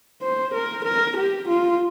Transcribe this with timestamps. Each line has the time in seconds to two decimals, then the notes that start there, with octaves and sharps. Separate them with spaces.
0.22 C5
0.54 A#4
0.85 A#4
1.17 G4
1.48 F4